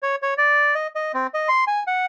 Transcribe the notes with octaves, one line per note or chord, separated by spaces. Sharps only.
C#5
C#5
D5
D#5
D#5
C4
D#5
C6
G#5
F#5